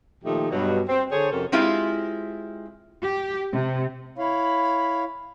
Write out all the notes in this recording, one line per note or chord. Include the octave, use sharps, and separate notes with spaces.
A#2 D#3 F3 A3 D#4 G4
G2 B2 F#3
C4
D3 G#4 A4 C5 C#5
F2 C3 C#4 F#4 A4 A#4
G#3 C4 E4 F4 G4
G4
C3
E4 C#5 F5 B5